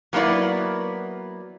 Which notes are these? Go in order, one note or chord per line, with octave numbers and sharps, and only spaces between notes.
F#3 A#3 B3 E4 D5